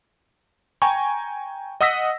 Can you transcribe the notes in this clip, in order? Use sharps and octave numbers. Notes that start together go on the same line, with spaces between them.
G5 G#5 A#5 C#6
D#5 F#5 D#6 E6 A#6 B6